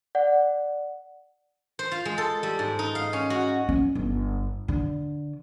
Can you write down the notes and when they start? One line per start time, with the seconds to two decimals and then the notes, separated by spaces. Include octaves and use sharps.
0.15 D5 F#5
1.79 C5
1.91 F4
2.05 G#3
2.18 A4
2.43 G3
2.59 G#2
2.79 D#4
2.95 F5
3.13 C#4
3.30 F#4
3.69 C#4
3.95 G1
4.68 D3